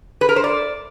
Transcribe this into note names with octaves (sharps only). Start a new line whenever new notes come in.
B4
A#4
C5
D5